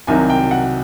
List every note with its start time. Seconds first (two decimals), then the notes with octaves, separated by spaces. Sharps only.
0.07 C2 C3 D#3 F#3 G#5
0.30 G5
0.51 F#5